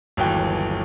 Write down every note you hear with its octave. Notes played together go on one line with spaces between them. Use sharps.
G1 D#2 E3 F#3 G5